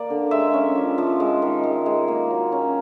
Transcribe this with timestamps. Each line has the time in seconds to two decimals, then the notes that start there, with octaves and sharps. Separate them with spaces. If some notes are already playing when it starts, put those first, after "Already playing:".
Already playing: A#3 D5
0.10 D3
0.31 G#3 E5
0.54 C#4
0.75 F3
0.98 F3
1.20 G#3
1.42 D#3
1.64 G#3
1.86 G#3
2.08 A#3
2.30 F#3
2.52 C#4